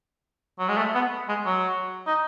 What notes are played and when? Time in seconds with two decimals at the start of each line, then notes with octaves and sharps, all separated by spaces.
0.59 F#3
0.68 G#3
0.78 A3
0.95 B3
1.28 G#3
1.46 F#3
2.07 D#4